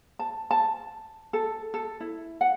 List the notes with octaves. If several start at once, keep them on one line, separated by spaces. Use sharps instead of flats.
A5
A5
A4
A4
E4
F#5